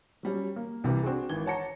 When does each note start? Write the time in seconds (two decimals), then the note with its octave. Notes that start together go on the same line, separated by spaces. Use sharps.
0.23 F#3 G3 C#4
0.56 A#3
0.84 C2 C3 E3
1.03 C4 D4 F#4 G#4
1.29 G#1 E3 G#6 G7
1.46 C#5 F#5 A5 A#5 A#6 C#7